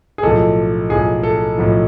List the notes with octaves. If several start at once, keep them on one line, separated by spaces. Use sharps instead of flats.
G#4
B1 A2 F3 A4
B1 A2 F3 G#4
A4
B1 A2 F3